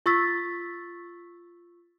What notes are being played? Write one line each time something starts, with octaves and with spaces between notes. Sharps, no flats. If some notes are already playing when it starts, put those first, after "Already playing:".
F4 C#6 E6 A6 B6